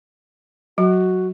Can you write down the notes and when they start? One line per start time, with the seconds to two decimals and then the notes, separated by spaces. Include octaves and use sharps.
0.78 F#3 F#4